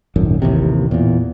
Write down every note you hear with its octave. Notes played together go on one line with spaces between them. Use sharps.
D#1 G#1 F#2
A1 D#2 C3
E2 A#2